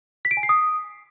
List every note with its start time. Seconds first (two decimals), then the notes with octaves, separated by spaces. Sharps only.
0.25 B6
0.31 D7
0.37 G#5
0.43 C7
0.49 D#6